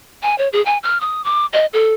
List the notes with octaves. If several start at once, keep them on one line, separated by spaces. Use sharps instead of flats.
G#5
C#5
G#4
G#5
F6
D#6
D6
D#5
A4